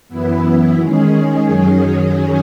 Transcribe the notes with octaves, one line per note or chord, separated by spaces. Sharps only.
F#2 E3 B3 E4
D#3 G#3 C#4 G#4
F#2 D#3 F#3 C#4 G#4